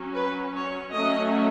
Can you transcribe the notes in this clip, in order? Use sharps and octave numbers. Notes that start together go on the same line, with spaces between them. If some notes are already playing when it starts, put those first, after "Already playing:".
Already playing: F#3 C#4
B4
C#5
F#3 A3 C#4 D#5